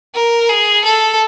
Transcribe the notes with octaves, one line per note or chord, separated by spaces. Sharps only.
A#4
G#4
A4